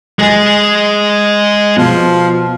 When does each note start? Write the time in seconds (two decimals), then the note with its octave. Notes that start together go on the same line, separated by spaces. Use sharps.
0.19 G#3 G#4 A6 A#6
1.77 B2 F3